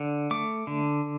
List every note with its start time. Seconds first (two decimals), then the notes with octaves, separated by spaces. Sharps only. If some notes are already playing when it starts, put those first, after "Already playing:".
Already playing: D3
0.31 A3 D6
0.67 D3